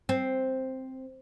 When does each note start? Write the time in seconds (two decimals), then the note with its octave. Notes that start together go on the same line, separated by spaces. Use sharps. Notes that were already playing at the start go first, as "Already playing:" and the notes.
0.09 C4